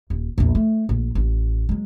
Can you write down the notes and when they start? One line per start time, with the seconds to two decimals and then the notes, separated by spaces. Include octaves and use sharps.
0.10 D#1
0.38 A#1 E2
0.55 A3
0.89 A#1
1.15 A1
1.69 F#3 G#3